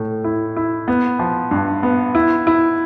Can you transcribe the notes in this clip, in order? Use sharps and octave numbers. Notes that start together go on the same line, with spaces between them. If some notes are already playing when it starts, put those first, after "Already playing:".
Already playing: A2 A3
E4
E4
B3
F3
G2
B3
E4
E4